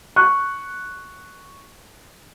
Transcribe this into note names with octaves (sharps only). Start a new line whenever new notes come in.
C#6 F#6